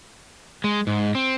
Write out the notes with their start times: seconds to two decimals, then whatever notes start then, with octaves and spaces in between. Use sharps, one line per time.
0.64 G#3
0.87 G#2
1.15 C4